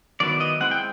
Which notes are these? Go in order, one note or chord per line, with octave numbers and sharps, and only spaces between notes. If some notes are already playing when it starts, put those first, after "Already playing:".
D#3 F#3 B3 E4 D5
D#5
G#3 C4 E4 F#5
G5